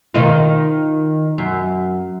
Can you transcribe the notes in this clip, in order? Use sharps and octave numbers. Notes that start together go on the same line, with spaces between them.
D#3 D#4 F4
F#2